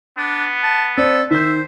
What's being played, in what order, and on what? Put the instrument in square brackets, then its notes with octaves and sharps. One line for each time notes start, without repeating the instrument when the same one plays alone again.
[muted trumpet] B3 [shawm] D4
[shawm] A5
[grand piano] C4 D5 [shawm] A4
[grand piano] D#3 G6 [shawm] C5 [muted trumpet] E5